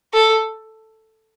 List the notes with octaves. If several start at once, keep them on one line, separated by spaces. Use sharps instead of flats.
A4